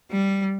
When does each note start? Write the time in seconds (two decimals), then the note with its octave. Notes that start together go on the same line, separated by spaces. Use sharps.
0.11 G3